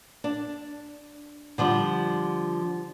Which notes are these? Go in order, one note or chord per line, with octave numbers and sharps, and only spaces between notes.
D4
D3 F3 G3